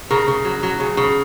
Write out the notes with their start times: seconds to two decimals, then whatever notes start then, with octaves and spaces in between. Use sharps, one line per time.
0.10 C#3 A#4
0.28 C#3
0.45 F#3
0.63 F#3
0.80 C#3
0.97 C#3